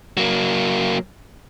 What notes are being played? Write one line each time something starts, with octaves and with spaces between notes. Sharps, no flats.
F#3 A#3